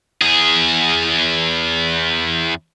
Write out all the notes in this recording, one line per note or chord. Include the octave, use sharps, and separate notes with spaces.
E2 G#4